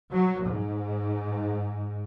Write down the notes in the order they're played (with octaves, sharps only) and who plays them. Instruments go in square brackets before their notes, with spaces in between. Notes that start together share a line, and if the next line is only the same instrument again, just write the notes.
[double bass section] F#3
G#2